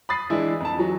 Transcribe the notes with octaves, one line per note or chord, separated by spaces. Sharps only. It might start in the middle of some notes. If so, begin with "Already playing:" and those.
B5 D#6 A6 C7
E3 G#3 D4 E4
F2 A5
E3 F#3